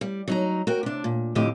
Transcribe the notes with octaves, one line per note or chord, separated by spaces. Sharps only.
G3
F#3 D#4 A#5
F#4 A#4 G5
C3 D4
A#2
F2 A2 D3 G4 D#5